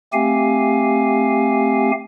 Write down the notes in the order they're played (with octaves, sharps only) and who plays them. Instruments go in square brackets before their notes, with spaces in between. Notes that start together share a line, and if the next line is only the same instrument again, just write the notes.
[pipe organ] A3 C4 G4 F5 G#5